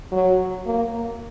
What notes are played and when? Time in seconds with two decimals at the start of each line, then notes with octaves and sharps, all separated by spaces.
0.12 F#3
0.66 A#3